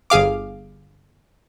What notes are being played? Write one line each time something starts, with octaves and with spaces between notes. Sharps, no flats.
G1 G#4 F5 D6